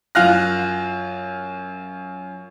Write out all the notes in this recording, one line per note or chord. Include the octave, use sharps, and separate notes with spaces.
F#2 F4 F5 F6 F#6 A#6